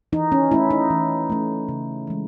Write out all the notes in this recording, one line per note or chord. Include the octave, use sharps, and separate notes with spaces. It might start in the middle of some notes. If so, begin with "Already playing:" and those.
E3 D#4
C#4
A3 C#4 E4
D#4
E3
A3 C#4
C#3
E3 G#3